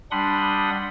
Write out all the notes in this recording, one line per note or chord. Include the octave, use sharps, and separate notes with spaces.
G3 D4 F#5 B5 C6 D#6